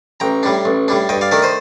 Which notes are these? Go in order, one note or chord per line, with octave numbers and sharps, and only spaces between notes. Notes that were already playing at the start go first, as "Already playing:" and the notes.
A1 G5 A#5
A2 G3 D4
A1
A2 G3 D4
G2 D#5 G5
D5 F5
D#3 A3 D4 A#4 D5
C5 D#5